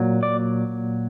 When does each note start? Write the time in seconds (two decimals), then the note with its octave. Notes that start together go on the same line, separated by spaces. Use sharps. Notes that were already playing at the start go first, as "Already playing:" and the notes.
Already playing: A#2 F#3
0.23 D5